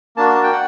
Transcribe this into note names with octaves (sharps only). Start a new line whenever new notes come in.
A#3 D4 F#4 A5
A5
G5
F#5